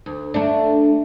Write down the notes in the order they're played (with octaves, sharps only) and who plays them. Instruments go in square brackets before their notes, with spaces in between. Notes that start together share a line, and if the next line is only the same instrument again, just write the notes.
[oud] D2
A3 D4